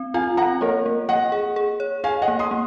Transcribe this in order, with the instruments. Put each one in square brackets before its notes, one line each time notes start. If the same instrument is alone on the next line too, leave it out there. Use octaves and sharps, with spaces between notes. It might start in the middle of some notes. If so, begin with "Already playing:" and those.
Already playing: [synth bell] C4
[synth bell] F4 [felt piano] F5 G#5
[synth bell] C4 [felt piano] F#5 A#5
[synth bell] A#3 [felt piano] A#4 C#5
[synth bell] A#3
[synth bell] A#3 [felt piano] D#5 F#5
[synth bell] G#4
G#4
C#5
[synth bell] G#4 [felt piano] F5 G#5
[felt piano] D#5 F#5
[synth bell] A#3
[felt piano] C6 D#6
[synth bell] A#3